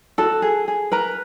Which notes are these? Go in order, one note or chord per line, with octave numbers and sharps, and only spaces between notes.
F#4 A4 A5
G#4
G#4
A#4 B4 A#5